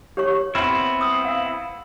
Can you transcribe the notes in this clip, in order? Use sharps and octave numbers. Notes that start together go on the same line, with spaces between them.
G4 C#5 C#6
B3 C4 E4
D#6 E6
F5